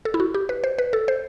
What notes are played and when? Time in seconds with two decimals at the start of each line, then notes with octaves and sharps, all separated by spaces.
0.05 A4
0.14 E4
0.20 F#4
0.34 G4
0.49 B4
0.64 C5
0.78 B4
0.93 A4
1.08 C5